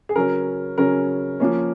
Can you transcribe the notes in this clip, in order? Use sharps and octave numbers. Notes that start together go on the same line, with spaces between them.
G#4
C#3 F#3 C#4 A#4
C#3 F#3 C#4 A#4
F3 A#3 C#4